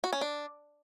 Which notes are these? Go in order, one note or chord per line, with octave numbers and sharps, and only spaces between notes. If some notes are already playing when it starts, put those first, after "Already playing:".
F#4
C#4
D4